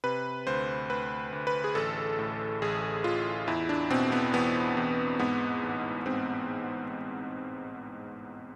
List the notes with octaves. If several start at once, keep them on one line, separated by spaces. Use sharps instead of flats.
C3 B4
D2 C5
D2 B4
D2
B4
G#4
A1 A4
A2
A1 G#4
A1 F4
E2 E4
D4
B2 C4
B3
E2 B3
E2
G#2 B3
A1
G#2 C4